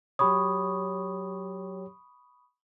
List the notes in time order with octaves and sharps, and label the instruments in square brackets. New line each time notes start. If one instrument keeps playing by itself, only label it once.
[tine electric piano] F#3 G4 C#5 [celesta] B5 C#6 D#6